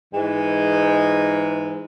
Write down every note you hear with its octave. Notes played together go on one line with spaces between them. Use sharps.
G#2 E3 G#3